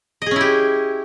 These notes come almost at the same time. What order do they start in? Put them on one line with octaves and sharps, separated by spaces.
D#5 G#4 C#4 E4 G4